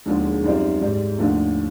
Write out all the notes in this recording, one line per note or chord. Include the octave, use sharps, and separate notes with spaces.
E1 D#2 D3 F3 G#3
F#2 D#3 G3 C4 F4
G#2 D#3 G3
D#2 D3 F3 A3